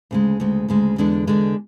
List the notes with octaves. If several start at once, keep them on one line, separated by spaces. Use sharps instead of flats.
D2 C#3 G#3
D2 C#3 G#3
D2 C#3 G#3
E2 D3 G#3 D4
E2 D3 G#3 D4